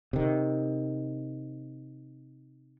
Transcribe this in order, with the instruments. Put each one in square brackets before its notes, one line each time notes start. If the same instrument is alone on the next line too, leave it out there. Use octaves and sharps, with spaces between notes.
[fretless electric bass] C3 D#3